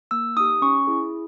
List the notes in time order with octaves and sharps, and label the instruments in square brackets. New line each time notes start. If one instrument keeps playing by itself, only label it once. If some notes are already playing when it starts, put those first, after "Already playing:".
[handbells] A#3 E6
D#4 G4 D#6
C#4 C#6
E4 G#4